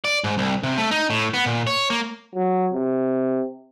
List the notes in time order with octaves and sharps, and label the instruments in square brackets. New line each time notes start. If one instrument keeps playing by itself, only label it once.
[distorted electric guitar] D5
G#2
C2
C3
A3
D#4
A2
B3
A#2
C#5
A#3
[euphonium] F#3
C3